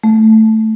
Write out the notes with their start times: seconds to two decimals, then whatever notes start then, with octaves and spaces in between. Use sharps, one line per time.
0.04 A3